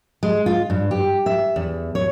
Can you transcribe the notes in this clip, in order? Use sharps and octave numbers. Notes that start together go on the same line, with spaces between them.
G#3
F4
G2
G4
E5
E2
C#5